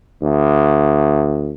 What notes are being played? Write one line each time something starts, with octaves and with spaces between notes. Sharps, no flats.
D2